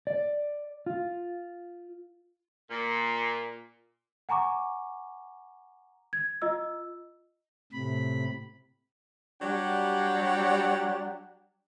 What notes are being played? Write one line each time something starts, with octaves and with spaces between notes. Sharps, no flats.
D5
F4
A#2
F#5 G#5 A#5 C#6 D6
G#6
F4 D#5 E6
A2 C3 B5
F#3 G3 D4 G4 F#5